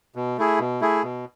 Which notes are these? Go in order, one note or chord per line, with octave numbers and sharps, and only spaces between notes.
B2
A3 E4 G#4
B2
A3 E4 G#4
B2